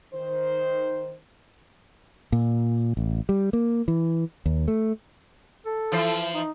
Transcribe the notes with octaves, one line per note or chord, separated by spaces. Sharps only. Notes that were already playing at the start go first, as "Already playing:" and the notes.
D#3 C5
A#2
A1
G3
A#3
E3
D#2
A3
A4
E3 F3 C5
D#4